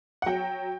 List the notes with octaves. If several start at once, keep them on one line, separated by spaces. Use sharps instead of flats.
F#5
F#3 G5